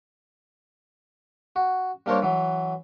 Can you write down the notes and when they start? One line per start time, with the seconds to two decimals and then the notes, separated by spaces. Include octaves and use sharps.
1.56 F#4
2.06 G3 A#3 D4 A#4 C5 C#5
2.22 E3 F#3